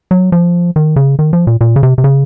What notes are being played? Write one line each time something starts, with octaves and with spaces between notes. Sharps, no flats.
F#3
F3
D#3
C#3
D#3
F3
A#2
A#2
C#3
C3
C3
C#3